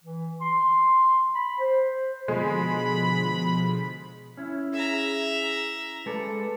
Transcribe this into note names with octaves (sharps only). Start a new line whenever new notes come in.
E3
C6
B5
C5
B2 D3 F3 G#3 B5
C#4 E4
G#4 E5 A#5
G#3 A4 B4 D5